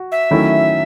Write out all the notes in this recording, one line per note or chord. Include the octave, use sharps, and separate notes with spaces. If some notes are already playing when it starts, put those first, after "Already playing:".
Already playing: F#4
E5
D#3 F#3 A3 C#4 E4